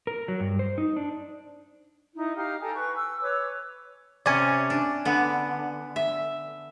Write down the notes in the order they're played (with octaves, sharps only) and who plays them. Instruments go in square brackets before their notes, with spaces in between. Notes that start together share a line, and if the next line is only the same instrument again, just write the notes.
[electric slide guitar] A#4
F#3
G2
C5
D#4
D4
[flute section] D#4 E4
D#4 G4 F5 F6
A4 G5 G#5 A#5
B4 G#5 C#6
E6
B4 C#5 D6 E6
[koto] C3 C#4 [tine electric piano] D5 G#5
[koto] D4
D3 B3
E5